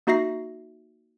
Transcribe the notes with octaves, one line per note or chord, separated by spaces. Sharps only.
A#3 D#4 F#4 E5 A#6 C7